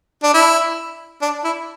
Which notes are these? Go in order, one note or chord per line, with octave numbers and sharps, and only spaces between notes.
D4
E4
D4
E4